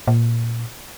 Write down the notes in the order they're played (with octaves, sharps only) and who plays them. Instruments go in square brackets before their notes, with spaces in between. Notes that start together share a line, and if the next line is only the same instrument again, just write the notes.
[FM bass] A#2